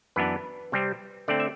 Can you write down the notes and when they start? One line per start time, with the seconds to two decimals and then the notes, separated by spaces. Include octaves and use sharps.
0.16 F#2 E3 B3 D4 B4
0.72 C3 G3 C4
1.28 D3 A3 C4 D5
1.40 E5